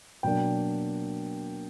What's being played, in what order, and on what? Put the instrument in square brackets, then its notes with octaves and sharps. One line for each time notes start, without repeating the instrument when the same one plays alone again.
[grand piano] B2 F#3 A#3 D4 G5